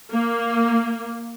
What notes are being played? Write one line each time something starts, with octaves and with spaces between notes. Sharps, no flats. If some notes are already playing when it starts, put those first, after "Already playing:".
A#3